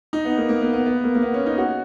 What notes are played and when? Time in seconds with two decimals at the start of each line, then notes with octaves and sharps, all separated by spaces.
0.13 D#4
0.25 B3
0.37 A#3
0.49 A#3
0.62 B3
0.73 B3
0.86 B3
1.04 A#3
1.15 A#3
1.23 B3
1.34 C#4
1.46 D#4
1.58 F#4